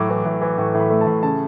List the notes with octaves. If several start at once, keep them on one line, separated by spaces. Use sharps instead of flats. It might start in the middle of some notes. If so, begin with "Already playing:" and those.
Already playing: A2 F#3 D6
E3
A2
E3
A2 C#6
A2
B5
A3
A5
A2
C#3 A5